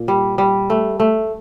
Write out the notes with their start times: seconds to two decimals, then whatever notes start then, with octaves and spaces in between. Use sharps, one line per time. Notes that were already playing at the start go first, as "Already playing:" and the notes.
Already playing: A#2
0.08 G3
0.38 G3
0.70 A3
1.00 A3